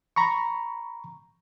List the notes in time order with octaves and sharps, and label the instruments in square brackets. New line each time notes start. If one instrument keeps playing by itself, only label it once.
[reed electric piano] A#5 B5 C#6